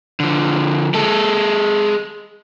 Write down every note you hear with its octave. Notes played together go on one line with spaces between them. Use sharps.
D3 F3
G#3 A4